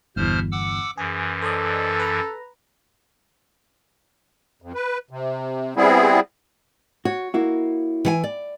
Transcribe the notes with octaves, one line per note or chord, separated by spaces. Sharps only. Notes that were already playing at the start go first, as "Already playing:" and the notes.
G1 E2 B2 C5 F6
F#5 D6 E6
F#2 E3 G#4
A4 C5 D5 D#5
B4 A#5
F2
B4
C3
G3 B3 C4 E4 G#4
F#4 C#5
A#3 E4 F#4
E3 F#5 G#5
D5